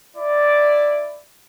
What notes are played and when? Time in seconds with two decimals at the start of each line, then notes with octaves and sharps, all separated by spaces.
0.17 E4 D5